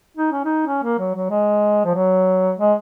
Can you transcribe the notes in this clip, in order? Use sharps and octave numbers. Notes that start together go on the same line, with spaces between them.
D#4
C#4
D#4
C#4
A#3
F#3
F#3
G#3
F3
F#3
G#3